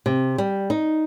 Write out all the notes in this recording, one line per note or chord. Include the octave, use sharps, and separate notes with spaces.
C3
G3
D#4